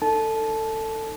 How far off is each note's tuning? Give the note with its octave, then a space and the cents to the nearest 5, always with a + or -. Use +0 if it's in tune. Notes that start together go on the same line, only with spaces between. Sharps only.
D#4 +0 A4 +20 A5 -20